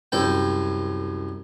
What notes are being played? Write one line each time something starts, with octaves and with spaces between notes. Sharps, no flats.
C2 F#2 A4 G5